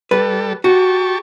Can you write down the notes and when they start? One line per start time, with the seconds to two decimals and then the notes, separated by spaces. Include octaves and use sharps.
0.11 G3 A4 B4
0.64 F#4 G4 A5 C#6